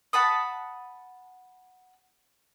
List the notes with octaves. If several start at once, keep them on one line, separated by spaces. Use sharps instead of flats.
F#5 A5 B5 D#6